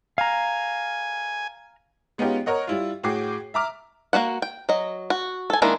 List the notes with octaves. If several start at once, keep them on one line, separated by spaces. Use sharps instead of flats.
F5 G#5 A#5
G#3 B3 C#4 D#4 F4 G4
A#4 C#5 D#5 F#5
G3 E4 F4
A2 F#4 G#4 G5 D6 C7
E5 A#5 D6 F6
A#3 D4 F#4 F#5
G5
F#3 D#5
F#4
A4 G#5
D#3 G#3 A#3 D4 E4